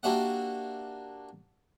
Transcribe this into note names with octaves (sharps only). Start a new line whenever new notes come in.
A#3 D4 F#4 G4 E5 F#5